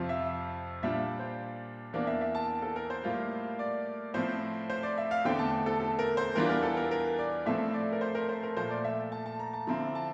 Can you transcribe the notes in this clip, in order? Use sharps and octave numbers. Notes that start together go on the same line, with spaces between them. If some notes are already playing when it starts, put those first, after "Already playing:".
Already playing: F2 C3 F3 C4 F4
E5
A#2 G3 D4 F4 E5
C5
E2 E3 A#3 D4 D5
E5
E5
A5
A4
A#4
C5
A2 G3 A#3 F4
D5
A2 F3 C4 C5
C5
D5
E5
F5
E2 D3 A3 C4 G5
A5
A4
A4
A#4
C5
E2 E3 G3 D4 F4 A#4
A#4
A4
A#4
A#4
D5
A2 F3 A3 C4 E5
D5
A#4
C5
A#4
C5
A#4
A#2 F3 A3 C5
D5
E5
A5
A5
A#5
A5
D3 F3 C4 E4 A#5
A5